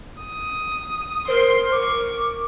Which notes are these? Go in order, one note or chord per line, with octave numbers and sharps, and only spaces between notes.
D#6
A#4 C5 C6
C#6 D6